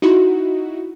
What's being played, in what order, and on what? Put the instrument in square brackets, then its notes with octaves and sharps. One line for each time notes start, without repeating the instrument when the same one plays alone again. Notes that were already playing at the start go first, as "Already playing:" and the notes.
[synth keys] D#4 E4 F#4